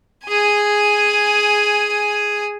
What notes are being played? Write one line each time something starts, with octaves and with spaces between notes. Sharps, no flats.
G#4 G#5